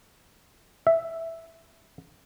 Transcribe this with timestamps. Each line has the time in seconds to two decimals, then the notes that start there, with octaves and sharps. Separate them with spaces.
0.87 E5